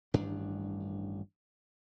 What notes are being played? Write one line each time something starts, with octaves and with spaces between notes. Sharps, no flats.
A1 G2 D#3 D4